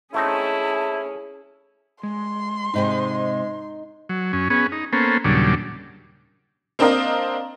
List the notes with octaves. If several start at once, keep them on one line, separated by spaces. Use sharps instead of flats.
A3 C4 C#4 D#4 E4 G#4 A5
G#3 C6
G#2 C3 G#3 D#4 C5 D#5
F#3
F#2 C#4
B3 C#4 G#4
D#4
A#3 B3 C#4 A4 C5
D#2 A#2 C#3 F#3 G3 D4
A#3 C4 D4 A#4 D#5 F5